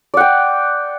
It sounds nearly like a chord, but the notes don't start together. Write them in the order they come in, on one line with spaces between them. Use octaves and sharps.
D5 F#5 G5